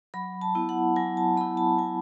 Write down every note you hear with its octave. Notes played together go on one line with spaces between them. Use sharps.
F#3 B5
A5
B3 E4
F#5
F#3 G#5
A5
B3 E4 B5
A5
F#3 G#5